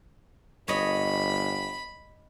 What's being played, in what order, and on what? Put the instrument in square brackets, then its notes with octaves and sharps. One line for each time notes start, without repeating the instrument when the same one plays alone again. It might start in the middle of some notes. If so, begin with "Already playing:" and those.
[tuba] G1 [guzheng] C#5 D#5 [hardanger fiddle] B5